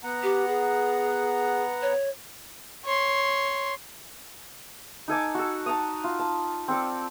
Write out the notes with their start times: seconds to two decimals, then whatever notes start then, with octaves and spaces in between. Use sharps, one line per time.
0.04 B3 F#5 A#5
0.23 G4
0.48 G#4
1.82 C#5
2.85 C#5 C6
5.08 D#4 A4 G#5 D6
5.35 F#4 A4
5.66 A5 A#5 D#6
6.04 F4
6.19 A5
6.68 C4 A4 D5